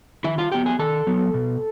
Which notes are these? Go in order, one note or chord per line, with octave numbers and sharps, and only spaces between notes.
D#3 E4 E5
F4 F5
F#3 B3 G4 G5
G#4 G#5
D#3 A4 A5
F#3 B3
B2